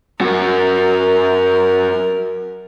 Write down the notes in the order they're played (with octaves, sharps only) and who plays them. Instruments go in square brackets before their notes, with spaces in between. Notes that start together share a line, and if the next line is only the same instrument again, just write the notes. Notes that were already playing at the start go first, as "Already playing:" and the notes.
[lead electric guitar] F#2 F#4 [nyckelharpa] A#4